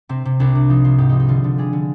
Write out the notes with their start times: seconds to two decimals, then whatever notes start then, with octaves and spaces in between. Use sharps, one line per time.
0.09 C3 C4
0.25 C3
0.40 C2 D4
0.55 C3
0.69 F3 D#4
0.84 F3 F4
0.98 G#2 G4
1.09 F3 D#4
1.20 D#4
1.28 D3 F4
1.44 D3
1.58 G3 G#4
1.73 D3